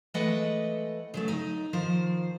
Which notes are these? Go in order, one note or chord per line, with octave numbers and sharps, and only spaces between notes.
E3 G#3 A3 B4 D#5 F#5
C#3 F#3 A3
D#4
D#3 F3 C5